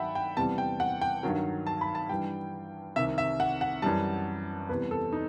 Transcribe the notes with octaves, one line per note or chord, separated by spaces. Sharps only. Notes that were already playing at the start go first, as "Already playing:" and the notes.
Already playing: G2 D#3 F#3 E5 F#5 G5 A5 B5
G5
E2 C3 E3 G3 A5
G5
F#5
G5
G2 D#3 F#3
A5
B5
A5
G2 E3 G3 G5
C2 C3 D#3 E5
E5
F#5
F#5
F#2 E3 G3 A5
E2 C3 E3 G3 B4
A4
D#4